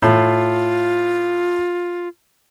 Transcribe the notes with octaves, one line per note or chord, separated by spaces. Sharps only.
A2 F4